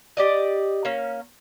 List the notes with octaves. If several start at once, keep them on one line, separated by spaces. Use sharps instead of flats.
G4 D5 D#5
A#3 C#4